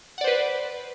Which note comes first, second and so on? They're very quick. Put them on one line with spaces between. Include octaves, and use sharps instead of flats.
F#5 D5 C5 B4